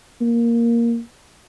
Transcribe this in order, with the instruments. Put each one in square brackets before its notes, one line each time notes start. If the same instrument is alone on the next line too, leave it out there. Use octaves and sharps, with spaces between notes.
[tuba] A#3